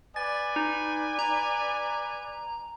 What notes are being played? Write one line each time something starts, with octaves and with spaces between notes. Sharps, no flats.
B4 D5 G#5 A6
D#4
A#5